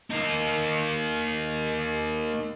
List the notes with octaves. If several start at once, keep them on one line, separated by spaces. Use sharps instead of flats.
A#3 D#4